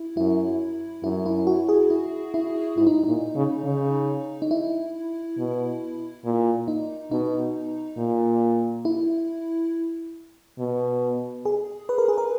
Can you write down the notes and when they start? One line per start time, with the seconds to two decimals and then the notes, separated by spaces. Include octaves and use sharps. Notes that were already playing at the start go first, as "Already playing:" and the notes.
Already playing: E4
0.17 F#2 E4
1.04 F#2 E4
1.26 E4
1.47 F#4
1.69 G#4
1.90 E4
2.34 E4
2.77 G#2 E4
2.87 D#4
3.04 A#2 D#4
3.36 C#3
3.64 C#3
4.42 D#4
4.51 E4
5.38 B2
6.25 A#2
6.68 D#4
7.11 B2 D#4
7.98 A#2
8.85 E4
10.59 B2
11.45 G#4
11.89 B4
11.98 A#4
12.08 G#4
12.18 A#4